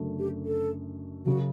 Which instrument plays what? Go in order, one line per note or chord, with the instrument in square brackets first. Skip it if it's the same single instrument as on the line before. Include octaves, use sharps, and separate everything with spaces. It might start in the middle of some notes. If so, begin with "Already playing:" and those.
Already playing: [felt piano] F#1 F#2 D3 A3
[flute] G4
A4
[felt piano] F#1 F#2 C#3 [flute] F#4